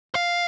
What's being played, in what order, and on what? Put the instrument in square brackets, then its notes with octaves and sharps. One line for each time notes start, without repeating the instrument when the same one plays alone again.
[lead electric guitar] F5